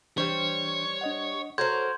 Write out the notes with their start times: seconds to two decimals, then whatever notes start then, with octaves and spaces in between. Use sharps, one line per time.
0.18 E3 G3 D4 C5 C#5
1.01 D4 D#5 F#5
1.58 F#4 A4 A#4 C5 C#5 C6 G6 G#6